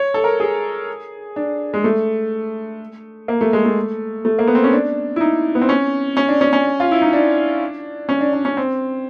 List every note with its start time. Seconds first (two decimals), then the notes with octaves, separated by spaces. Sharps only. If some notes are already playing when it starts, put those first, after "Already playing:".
Already playing: C#5
0.14 A4
0.24 A#4
0.40 G#4
1.36 D4
1.74 G#3
1.84 A3
3.28 A#3
3.41 A3
3.53 G#3
3.65 A3
4.25 A3
4.39 A#3
4.47 B3
4.55 C4
4.64 C#4
4.73 D4
5.16 E4
5.21 D#4
5.55 B3
5.62 C4
5.69 C#4
6.17 C#4
6.29 D4
6.41 C#4
6.53 C#4
6.80 F4
6.92 E4
7.02 D#4
7.13 D4
8.09 C#4
8.21 D4
8.33 D4
8.45 C#4
8.57 C4